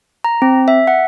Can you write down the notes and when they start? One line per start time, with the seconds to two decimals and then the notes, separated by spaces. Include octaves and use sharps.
0.24 A#5
0.42 C4
0.68 E5
0.87 F#5